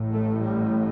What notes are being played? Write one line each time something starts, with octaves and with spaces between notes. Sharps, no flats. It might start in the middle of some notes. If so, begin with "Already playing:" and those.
Already playing: A1 A2
A3
G3